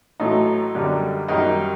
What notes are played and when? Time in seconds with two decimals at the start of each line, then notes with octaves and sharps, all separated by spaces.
0.20 A1 A2 F#3 A3 D#4
0.75 F#2 D3 G3
1.28 F#2 D#3 G3 D#4